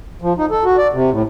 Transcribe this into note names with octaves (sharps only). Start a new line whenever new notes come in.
F3
D#4
A4
F#4
D5
C3
A2